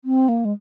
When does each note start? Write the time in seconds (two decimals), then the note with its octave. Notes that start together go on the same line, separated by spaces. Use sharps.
0.05 C4
0.29 A#3
0.45 G#3